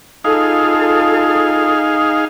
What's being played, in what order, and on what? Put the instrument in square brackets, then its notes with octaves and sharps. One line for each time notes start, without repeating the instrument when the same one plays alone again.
[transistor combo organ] D#4 G#4 F5 [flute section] F4 A4